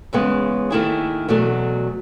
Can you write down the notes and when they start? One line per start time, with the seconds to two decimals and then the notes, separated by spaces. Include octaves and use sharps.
0.13 E2 C#3 G#3 B3
0.71 D#2 D#3 A3 E4 G#4
1.28 E2 B2 F#3 A3